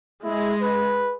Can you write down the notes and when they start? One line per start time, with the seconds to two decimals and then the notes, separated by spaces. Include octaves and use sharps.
0.24 G#3 E4
0.61 B4